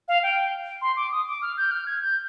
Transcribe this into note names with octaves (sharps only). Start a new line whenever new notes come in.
F5
G5
C6
D6
D#6
D6
F6
G6
F6
G#6
G6